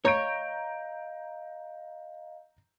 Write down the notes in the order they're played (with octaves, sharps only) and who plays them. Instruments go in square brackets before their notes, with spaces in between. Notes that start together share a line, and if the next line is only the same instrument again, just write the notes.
[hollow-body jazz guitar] C#5 [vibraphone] D#5 F5 [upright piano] A#5 G6 D7